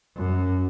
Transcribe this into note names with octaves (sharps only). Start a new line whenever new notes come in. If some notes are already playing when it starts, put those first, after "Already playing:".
F#2